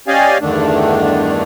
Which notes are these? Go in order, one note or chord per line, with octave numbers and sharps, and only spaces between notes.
C#4 G4 D5 D#5 F5 G#5
E2 G2 D3 D#3 A3 D4